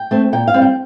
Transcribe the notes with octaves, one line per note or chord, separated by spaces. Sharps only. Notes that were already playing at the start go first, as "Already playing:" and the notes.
Already playing: G5
A3 C4
A#2 G5
F5
G3 C4
G5